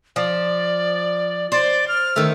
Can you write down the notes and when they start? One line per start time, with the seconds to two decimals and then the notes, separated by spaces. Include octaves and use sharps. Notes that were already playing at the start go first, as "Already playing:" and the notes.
0.16 F3 D5
1.52 C5 D5
1.88 F6
2.16 D#3 A3 E6